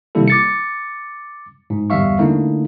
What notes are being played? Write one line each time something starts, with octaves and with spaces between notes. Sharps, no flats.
C3 D#3 G3 A#3 E4 A4
D6 A6 C#7
G#2
G1 E2 G3 E5 F5 C#6
D3 A3 A#3 D#4 E4